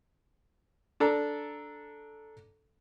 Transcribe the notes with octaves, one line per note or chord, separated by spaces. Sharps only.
D4 A4 A#5